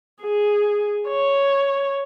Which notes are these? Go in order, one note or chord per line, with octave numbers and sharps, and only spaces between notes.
G#4
C#5